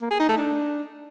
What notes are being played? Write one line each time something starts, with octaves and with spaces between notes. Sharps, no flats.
A#3
G#4
D#4
A3
D4